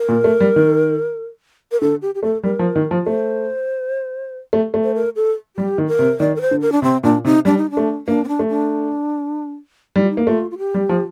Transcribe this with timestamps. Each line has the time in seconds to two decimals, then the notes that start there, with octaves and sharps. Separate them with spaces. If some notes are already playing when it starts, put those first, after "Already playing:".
Already playing: A#4
0.09 A#2
0.24 A3
0.40 G3
0.56 D#3
1.72 A#4
1.81 D3 A4
2.02 G4
2.15 G4
2.23 A3 A4
2.44 G3 A#4
2.59 F3
2.76 D#3
2.91 F3
3.06 A3 C5
4.53 A3
4.74 A3
4.83 C5
4.95 A#4
5.16 A4
5.57 G3 G4
5.78 D#3
5.88 A#4
5.99 C3
6.20 D#3 D5
6.36 A#4
6.41 C5
6.51 D3
6.61 A#4
6.72 D4
6.82 C3 C4
7.03 A#2 D4
7.25 C3 D#4
7.45 G3 D4
7.57 D#4
7.71 D4
7.77 A3
8.07 A#3 D4
8.24 C4
8.28 D4
8.39 A3
8.49 D4
9.96 G3 D#4
10.04 F4
10.10 D#4
10.17 A#3
10.27 A3 F4
10.51 F4
10.58 G4
10.74 G3
10.89 F3